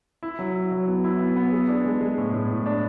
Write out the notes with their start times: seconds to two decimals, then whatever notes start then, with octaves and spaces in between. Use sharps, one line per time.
0.23 E4
0.39 F#3
0.55 E4
0.72 F#3
0.87 B3
1.04 E4
1.20 B3
1.36 B3
1.52 G#4
1.69 D4
1.85 G#3
2.01 G#3
2.17 A2
2.33 A2
2.50 A2
2.66 D4